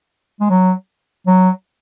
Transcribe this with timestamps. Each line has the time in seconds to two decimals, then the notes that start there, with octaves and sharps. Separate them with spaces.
0.40 G#3
0.50 F#3
1.27 F#3